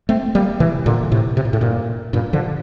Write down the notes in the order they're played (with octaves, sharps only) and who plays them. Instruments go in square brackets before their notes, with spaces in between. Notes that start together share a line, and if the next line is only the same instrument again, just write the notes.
[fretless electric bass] A3 C4
G3 A#3
C3 E3
A#2 D3
A2 C3
C3
A#2
A2
G2 A#2
G2 A#2
D3 F3